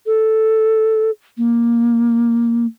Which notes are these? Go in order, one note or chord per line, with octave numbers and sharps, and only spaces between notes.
A4
A#3